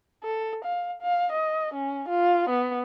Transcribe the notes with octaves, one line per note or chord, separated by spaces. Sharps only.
A4
F5
F5
D#5
C#4
F4
B3